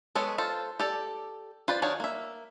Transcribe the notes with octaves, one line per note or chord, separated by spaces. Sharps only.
G#3 B3 A4 C#5
F4 A4 C5
G4 A4 D5
F4 B4 C5 D5
D#3 D4 F#4 C#5 F5
A#3 E5